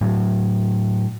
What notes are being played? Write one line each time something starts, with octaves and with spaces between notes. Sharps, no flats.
A2 F#3